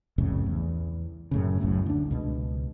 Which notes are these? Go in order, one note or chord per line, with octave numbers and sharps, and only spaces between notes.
C2 F2 A2 C#3
E2
F#2 A2 C#3
F#1 B1 F#2 A2
D2 D4
C#2 B2